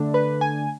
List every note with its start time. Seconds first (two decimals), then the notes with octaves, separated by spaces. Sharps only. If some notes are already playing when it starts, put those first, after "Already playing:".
Already playing: D3 A3 D4
0.14 B4
0.41 G#5